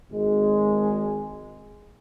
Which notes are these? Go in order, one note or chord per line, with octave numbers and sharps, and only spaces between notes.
G#1 G#3